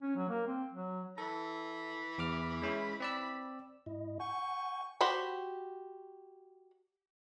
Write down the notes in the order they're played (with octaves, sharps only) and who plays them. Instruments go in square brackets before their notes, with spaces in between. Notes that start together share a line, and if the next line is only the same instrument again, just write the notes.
[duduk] C#4
F#3
A#3
C4
F#3
[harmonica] E3 B5 [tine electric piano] A4
[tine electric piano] E2 D6 F6
G#3 C#4 E4
C4 D5 E6
[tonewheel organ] G#2 E4 D#5
[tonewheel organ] F#5 G#5 G6 [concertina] C#6
[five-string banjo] F#4 G4 C5 B5